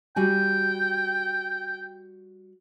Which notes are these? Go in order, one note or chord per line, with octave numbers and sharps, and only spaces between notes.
G3 F#4 G5 G#5